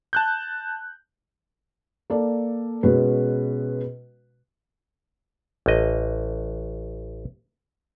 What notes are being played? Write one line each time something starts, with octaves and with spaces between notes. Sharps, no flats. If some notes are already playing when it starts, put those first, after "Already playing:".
A5 F#6 G6
A#3 A4 D5
B2 G#3 C#4 F#4 B4
A1 D#5